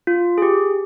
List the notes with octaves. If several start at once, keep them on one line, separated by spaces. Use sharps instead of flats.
F4
G#4
G4